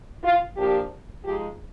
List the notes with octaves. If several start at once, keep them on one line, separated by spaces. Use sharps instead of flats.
F4
A#2 F3 A#3 D4 G4
F3 G#3 D#4 G4